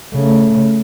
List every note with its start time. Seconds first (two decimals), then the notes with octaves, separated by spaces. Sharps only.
0.14 C#3 A3